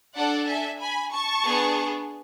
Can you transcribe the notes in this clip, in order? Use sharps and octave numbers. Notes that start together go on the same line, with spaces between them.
D4 A4 D5 F#5
E5 G#5
G#5 B5
A5 C#6
B3 D4 G#4